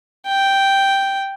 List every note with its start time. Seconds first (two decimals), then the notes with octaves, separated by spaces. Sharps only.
0.27 G5